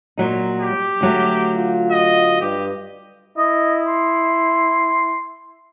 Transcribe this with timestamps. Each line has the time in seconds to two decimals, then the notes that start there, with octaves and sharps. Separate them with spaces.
0.18 A#2 F#3 D#4
0.61 G4
1.01 D2 F#3 A3
1.56 F4
1.91 D#5
2.41 G2 G4
3.38 E4 D#5
3.87 C6